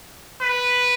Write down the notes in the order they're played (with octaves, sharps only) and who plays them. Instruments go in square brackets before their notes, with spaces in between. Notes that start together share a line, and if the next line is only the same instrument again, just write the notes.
[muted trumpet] B4